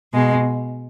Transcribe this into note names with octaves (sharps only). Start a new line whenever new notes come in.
B2 G#3